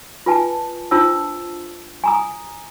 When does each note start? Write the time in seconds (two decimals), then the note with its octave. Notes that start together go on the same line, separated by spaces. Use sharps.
0.26 F4 B4 G#5 A5
0.91 D4 F4 C5 A5 E6
2.04 G#5 A#5 D#6